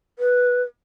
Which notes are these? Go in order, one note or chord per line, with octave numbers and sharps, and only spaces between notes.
B4